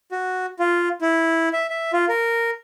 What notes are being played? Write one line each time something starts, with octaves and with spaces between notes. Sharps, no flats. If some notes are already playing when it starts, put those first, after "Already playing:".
F#4
F4
E4
E5
E5
F4
A#4